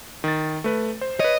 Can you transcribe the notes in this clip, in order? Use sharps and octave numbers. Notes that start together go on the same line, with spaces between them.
D#3 A6
A3 B4
C5
B4 C#5 D#5